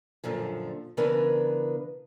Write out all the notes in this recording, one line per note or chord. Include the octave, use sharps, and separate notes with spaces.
F#2 A#2 D3 F3
C#3 E3 B3 D4 A#4 B4